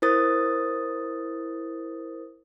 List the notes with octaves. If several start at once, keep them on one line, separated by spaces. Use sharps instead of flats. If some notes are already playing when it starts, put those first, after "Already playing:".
E4 A#4 C5 D#6 A6